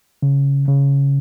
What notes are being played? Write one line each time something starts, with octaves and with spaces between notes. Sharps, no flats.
C#3
C#3